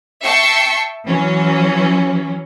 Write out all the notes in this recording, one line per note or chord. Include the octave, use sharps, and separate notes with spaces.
E5 G5 A5 C#6 C7 C#7
E3 F#3 C#4